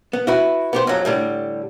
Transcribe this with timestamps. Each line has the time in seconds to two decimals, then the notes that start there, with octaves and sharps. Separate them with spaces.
0.13 B3
0.27 E4 F#4 B4
0.73 B3 G4 C5
0.87 F2 F#3
1.05 A2 D3 G3